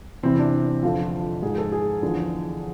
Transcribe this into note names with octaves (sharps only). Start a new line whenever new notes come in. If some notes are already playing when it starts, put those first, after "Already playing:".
E2 C3 E3 C4
D4
F2 D3 F3 F4
G#2 F3 G#4
A4
G#4
E2 D3 F3